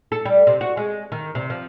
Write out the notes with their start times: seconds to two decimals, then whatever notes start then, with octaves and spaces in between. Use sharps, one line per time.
0.12 A4
0.25 G3
0.47 C3
0.61 F#4
0.77 G#3
1.12 D#3
1.35 C3
1.50 F3